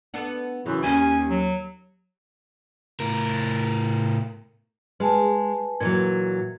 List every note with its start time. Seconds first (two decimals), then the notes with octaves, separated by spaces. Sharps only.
0.14 B3 D4 A4
0.66 F#2 C#3 E3
0.83 D#2 G3 C#4 G#5
1.30 F#3
3.00 A2 A#4
5.00 G#3 B4 G#5 A5
5.80 A#2 E3 F#3 G#6